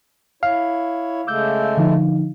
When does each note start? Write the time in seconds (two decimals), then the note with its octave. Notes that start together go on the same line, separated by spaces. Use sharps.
0.43 E4 C#5 F5
1.27 C#3 G#3 A3 D6 E6 G6
1.77 D3 F3 D#4